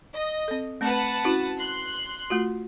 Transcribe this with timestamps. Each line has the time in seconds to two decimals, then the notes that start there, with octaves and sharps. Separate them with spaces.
0.14 D#5
0.48 C4 A4
0.81 A3 C4 B4 F#5 A5
1.25 C#4 E4 F#4
1.59 C6 F#6
2.30 A3 F4 F#4